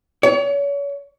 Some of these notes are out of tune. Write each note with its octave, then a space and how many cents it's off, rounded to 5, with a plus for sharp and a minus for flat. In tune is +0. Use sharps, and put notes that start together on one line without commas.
C#5 +35